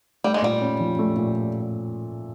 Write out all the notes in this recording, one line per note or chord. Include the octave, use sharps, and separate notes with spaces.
G3 A3
G#3
A#2 G3
C#4
F3
A3
A#2